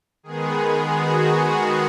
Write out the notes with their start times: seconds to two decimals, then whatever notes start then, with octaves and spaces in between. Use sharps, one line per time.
0.23 D#3 G#3 B3 G#4
0.92 F#4
1.28 F#4